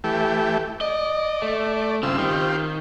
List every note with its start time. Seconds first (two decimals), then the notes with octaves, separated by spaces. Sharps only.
0.04 E3 A3 G4
0.81 D5 D#5
1.42 A3
2.03 G2 C#3 C4 F4 E6
2.18 D#3 C4 F4 G4